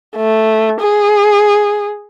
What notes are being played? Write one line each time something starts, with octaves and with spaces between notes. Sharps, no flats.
A3
G#4